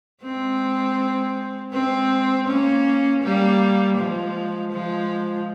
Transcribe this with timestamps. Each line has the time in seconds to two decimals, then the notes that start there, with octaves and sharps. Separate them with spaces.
0.23 G#3 C4
1.73 G#3 C4
2.47 A#3 C#4
3.22 G3 A#3
3.97 F3 G#3
4.72 F3 G#3